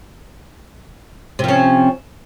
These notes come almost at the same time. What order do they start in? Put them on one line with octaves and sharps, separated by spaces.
C3 F3 C#4